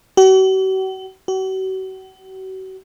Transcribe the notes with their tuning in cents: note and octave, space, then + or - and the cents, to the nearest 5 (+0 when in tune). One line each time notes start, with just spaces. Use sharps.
F#4 +45
F#4 +40